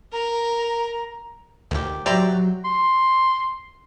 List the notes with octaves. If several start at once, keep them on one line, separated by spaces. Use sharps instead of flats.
A#4 A#5
D2 D#3 G4
F#3 G4 D5 E5 G5 A#5 C6
C6